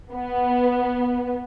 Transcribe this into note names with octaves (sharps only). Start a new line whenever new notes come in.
B3